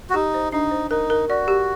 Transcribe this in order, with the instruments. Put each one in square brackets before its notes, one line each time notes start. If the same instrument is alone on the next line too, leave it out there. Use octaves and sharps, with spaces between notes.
[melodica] F#4
[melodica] D#4 [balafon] G4
[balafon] C5
[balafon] D4 [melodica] D#4
[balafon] C5
[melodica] D#4 [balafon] A#4
[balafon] A#4
[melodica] F#4 [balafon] D5
[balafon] G4